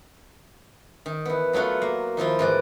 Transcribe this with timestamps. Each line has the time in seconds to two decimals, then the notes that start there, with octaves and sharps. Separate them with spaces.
1.06 D#3
1.25 E3 B3
1.53 F#3 A3 B3 F4 F#4
1.82 A#3
2.17 D#3 F3 E4 F4
2.39 G#2 E3 D5